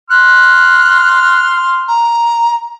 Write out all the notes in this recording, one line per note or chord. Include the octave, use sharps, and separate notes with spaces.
C6 F6 F#6
A#5